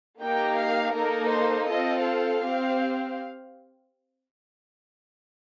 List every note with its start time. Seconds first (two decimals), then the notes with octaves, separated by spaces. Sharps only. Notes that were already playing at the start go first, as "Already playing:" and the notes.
0.20 A#3 D#4 G4 G5
0.57 F5
0.94 A#3 D#4 A4 A#4
1.31 C5
1.68 C4 F4 A4 D#5
2.04 F5
2.42 C4 G4